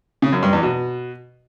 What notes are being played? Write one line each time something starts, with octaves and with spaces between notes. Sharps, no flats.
C#3
F#2
G2
E2
B2